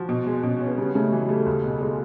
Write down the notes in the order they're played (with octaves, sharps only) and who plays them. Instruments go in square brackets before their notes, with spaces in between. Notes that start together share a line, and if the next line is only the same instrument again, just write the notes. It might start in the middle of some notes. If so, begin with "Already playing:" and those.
Already playing: [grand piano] F3 [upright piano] F#4
[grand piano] B2
G#3
[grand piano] B2 [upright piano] C#4
[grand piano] C#4
[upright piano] B3
[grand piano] C#3 [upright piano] G3
[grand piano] C#3 [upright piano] A3
[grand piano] E3 [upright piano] F#3
[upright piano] G3 [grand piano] A3
[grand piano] C#2
B2
[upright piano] G#3